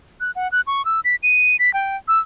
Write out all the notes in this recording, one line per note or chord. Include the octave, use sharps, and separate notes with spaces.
F#6
F#5
F#6
C#6
E6
B6
D#7
B6
G5
E6